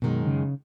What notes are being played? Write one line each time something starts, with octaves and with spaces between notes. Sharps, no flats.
F#2 B2 D#3 G#3
C#3